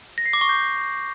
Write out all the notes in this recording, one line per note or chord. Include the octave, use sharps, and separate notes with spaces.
A#6
C7
D6
C#6
G6